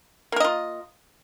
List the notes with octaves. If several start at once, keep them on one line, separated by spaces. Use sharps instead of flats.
A#3 F4 A#4 D#5